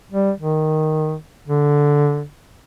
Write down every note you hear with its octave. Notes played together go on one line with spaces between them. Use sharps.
G3
D#3
D3